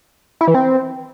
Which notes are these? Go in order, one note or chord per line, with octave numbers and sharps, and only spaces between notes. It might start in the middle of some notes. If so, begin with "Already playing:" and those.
E4
E3
C4